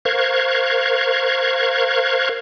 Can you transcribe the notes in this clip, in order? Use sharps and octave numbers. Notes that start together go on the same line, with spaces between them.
A#4 C5 F5 C#6 F#6 G#6